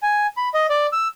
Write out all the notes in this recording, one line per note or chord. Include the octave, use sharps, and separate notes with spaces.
G#5
B5
D#5
D5
E6